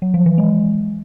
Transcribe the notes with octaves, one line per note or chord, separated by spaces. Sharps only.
F#3
F3
E3
G#3